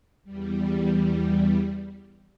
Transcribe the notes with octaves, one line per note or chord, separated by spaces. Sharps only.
E2 G3